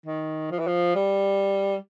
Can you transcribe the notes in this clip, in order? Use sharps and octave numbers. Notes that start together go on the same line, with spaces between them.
D#3
F3
E3
F3
G3